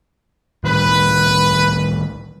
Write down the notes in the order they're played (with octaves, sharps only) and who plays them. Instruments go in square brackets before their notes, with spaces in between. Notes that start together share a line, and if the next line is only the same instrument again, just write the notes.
[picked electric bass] A2 D#3 G3 [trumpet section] B4